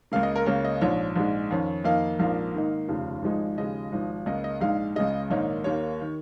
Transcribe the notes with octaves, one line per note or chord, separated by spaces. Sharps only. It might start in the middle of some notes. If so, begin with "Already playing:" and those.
C#2 C#3 A#3 F5
D#5
A#4
C#2 C#3 A#3 C#4
D#5
A#1 G#2 F3 C#5
A#1 G#2 G#3
F2 D#3 C#4
F2 D#3 A#3 D#4 F5
A#1 G#2 F3 A#3 F5
G#2 D#3 A#3 D#4
F1 D#2 C#3 F3
G#1 G#2 F3 G#3 D#4
D#2 C#3 F3 G#3 D#5
G#1 G#2 F3
C#2 C#3 A#3 D#5
D#5
A#1 G#2 G#3 D#4 F5
C#2 C#3 G#3 D#5
A#1 G#2 D#3 A#3 D#4 C#5
D#2 D#3 A#3 C#5
D#3